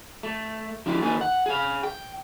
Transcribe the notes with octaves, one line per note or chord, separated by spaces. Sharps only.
A3
F3 D4 E4 G4
D#2 A#3 D#4 G#4 A4 G#5
F#5
G#4 F5
G5